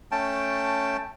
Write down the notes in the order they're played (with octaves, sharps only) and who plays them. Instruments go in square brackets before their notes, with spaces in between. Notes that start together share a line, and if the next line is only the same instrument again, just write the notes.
[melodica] A3 C#4 G5 A5